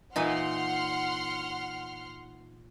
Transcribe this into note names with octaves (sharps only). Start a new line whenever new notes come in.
A#2 E3 D#4 F#5 C6 F6